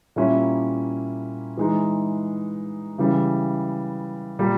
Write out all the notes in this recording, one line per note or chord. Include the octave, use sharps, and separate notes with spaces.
A#2 G3 A#3 C#4 E4
E3 G#3 D#4
C#3 E3 G3
A#2 G3 A#3